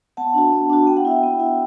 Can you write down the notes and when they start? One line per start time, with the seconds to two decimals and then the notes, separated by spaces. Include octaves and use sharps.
0.17 B3 F#5 A5
0.34 D4 F#4
0.52 B3
0.70 D4 F#4
0.87 B3 G5
0.97 F#5
1.05 E4 E5 G5
1.23 B3
1.40 E4